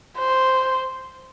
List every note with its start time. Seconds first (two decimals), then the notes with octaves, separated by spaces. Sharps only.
0.18 C5